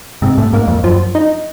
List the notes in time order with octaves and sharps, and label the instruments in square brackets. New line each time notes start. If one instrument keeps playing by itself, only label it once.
[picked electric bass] G#2 [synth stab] C3
[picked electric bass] A2
[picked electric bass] G#2 [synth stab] A#3
[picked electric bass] F2
[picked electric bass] F#2 [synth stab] F3
[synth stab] D#4